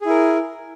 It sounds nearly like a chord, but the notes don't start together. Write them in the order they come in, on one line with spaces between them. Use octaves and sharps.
G#4 E4 A#4